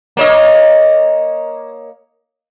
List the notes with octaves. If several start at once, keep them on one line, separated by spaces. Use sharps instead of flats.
A#3 C#5 D#5